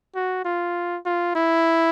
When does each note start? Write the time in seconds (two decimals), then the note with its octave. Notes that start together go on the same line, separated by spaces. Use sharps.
0.15 F#4
0.45 F4
1.05 F4
1.35 E4